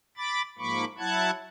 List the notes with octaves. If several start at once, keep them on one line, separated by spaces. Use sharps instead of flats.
B5 D6 A6
G#2 F3 A#3 B5 C#6 D6
F#3 E4 F#5 A5 F#6 G#6